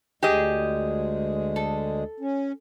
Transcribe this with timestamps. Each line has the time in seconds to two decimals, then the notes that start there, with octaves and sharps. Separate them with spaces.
0.23 D2 G#3 G4 G#4 D#5
1.56 A4
2.20 C#4